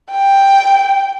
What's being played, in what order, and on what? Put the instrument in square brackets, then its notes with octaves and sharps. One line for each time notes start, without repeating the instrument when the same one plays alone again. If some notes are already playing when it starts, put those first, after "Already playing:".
[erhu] G5